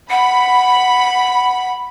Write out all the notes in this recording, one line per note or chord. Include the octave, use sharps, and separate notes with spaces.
F#5 B5